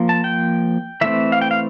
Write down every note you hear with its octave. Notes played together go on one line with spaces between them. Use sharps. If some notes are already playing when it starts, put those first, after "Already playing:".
Already playing: F3 A#3
A5
G5
E3 A3 C4 E5
F5
G5
F5